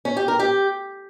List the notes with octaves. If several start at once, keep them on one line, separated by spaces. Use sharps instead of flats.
C#4
G4
A#4
G4